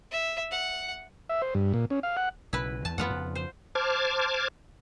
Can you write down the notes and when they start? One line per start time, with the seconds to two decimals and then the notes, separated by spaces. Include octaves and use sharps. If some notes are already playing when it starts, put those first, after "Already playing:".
0.11 E5
0.51 F#5
1.29 E5
1.42 C5
1.55 G2
1.74 A#2
1.90 C#4
2.03 F5
2.17 F#5
2.53 B1 C#3 E4 B4
2.85 E2 A5
2.98 F2 E3 A3 B3 F4 F#5
3.10 F2 C#3
3.35 C5
3.75 C5 A5 D6 F6 G#6